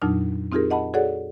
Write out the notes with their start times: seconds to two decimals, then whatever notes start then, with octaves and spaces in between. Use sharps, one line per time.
0.02 F2 A#2 F#3 D4 D#4 F6
0.52 C4 D#4 F4 G4 G#4 A#4
0.70 D#5 F#5 A5 B5
0.94 F#4 G#4 A4 C#5 D5 F#5